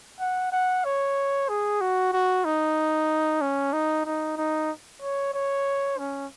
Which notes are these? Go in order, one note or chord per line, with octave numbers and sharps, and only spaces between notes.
F#5
F#5
C#5
G#4
F#4
F#4
D#4
C#4
D#4
D#4
D#4
C#5
C#5
C#4